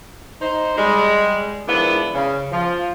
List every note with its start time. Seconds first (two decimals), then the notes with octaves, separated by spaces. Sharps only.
0.41 D#4 C5
0.77 G3 G#3
1.67 D#3 F3 G#3 B3 D4 E4
2.14 C#3
2.51 F3